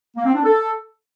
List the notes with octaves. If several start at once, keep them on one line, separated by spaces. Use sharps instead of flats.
A#3
C4
D4
A4